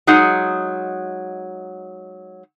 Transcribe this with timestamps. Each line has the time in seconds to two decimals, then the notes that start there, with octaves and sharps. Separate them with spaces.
0.07 F#3 G#3 D#4 G#4 F#5